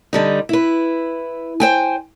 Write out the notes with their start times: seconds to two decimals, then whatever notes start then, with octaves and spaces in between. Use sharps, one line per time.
0.13 D3 G3 D#4
0.49 E4 B4
1.60 C5 G5 G#5